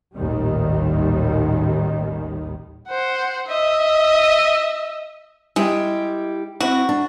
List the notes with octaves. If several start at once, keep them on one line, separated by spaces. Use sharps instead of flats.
A1 D#2 A#2 D#3 G3
C5 F#5
D#5 E5
G3 G#3 E4 G4
C4 E4 F#4
D4